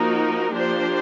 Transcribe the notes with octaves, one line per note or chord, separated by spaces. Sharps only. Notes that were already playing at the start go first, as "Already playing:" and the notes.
Already playing: F3 A#3 D#4 F#4 A#4
F3 A#3 D4 G4 C5